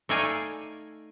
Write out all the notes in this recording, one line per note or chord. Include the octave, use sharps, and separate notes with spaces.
A3 D#4 A4 D5 F5 G#5